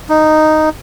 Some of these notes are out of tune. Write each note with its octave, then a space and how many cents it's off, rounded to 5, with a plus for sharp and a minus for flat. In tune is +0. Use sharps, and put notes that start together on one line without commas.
D#4 -5